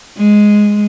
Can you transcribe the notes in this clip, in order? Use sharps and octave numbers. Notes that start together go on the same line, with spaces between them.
G#3